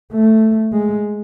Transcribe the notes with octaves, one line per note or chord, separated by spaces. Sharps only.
A3
G#3